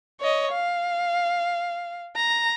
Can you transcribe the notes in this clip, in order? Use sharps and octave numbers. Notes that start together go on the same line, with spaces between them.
C#5 D#5
F5
A#5